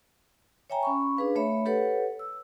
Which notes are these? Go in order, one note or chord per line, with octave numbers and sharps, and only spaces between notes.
C#5 E5 G5 G#5 A#5
C#4 B5 C#6
D4 G#4 B4 F5
A3 C#5 E5 B5
G4 A4 B4 C#5 F#5
E6